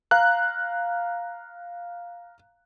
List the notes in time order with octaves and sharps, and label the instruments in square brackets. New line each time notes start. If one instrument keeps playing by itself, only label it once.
[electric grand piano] F5 A#5 F#6